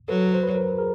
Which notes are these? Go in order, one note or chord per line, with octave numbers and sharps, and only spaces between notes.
F#3 A4 B4
C5
B4
A#4 C5
G#4 A#4